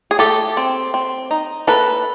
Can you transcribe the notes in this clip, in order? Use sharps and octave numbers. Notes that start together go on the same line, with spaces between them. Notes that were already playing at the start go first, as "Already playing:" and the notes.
G#4
A3 G4 A4
C4
C4
D#4
A#3 A4 B4